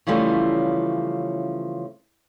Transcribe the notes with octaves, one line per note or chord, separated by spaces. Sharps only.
C#3 E3 F3 G3 A3 C#4